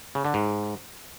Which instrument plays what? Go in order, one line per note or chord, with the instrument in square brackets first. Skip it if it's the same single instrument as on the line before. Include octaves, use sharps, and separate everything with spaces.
[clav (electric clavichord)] C#3
D3
G#2